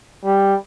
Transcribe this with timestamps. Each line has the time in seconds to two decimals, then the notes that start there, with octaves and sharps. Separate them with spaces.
0.24 G3